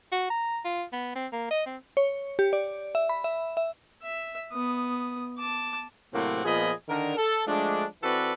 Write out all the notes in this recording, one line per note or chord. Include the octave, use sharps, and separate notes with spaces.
F#4
A#5
F4
B3
C4
A#3
D#5
C4
C#5
G4
D5
E5
B5
E5
E5
E5
B3 D#6
A5 D6
A2 C3 F#3 A#3 C4 F#5
A#2 F3 B3 G#4 D#5 B5
D3 D#3 D4 A#4
A4
F3 G#3 A3 D4
E3 C4 F#4 A4 B4 D5